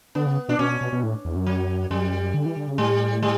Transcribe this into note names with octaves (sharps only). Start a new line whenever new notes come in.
D3 B3
C#3
B2 D4
B2 C#4
B2
B2
A2
E2
F#2
F#3
F#2 G3
D3
E3
D3
C#3
A2 G3
G3